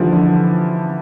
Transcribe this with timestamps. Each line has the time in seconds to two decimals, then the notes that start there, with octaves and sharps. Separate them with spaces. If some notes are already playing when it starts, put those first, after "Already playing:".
Already playing: D3 E3 F3 G3
0.12 D3